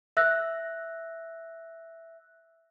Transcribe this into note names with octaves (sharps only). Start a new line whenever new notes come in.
E5 E6 F#6 A#6